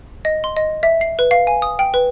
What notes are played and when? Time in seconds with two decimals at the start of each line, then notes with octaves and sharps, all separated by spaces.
0.25 D#5
0.44 C6
0.57 D#5
0.83 E5
1.01 C7
1.19 B4
1.31 F5
1.47 G#5
1.62 D#6
1.79 G5
1.94 B4